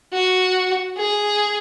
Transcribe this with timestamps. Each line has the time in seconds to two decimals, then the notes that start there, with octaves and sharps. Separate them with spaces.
0.13 F#4
0.97 G#4